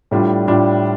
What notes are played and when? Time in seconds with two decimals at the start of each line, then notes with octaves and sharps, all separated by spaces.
0.11 A2 G3 D4 F4
0.48 A2 G3 D4 F4